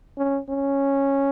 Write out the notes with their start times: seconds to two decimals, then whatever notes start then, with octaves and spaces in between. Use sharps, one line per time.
0.18 C#4
0.49 C#4